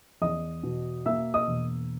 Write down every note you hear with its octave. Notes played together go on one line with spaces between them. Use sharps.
E2 D#5 D#6
B2
A#3 E5 E6
D#5 D#6
E1